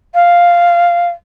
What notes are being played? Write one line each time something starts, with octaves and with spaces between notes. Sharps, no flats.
F5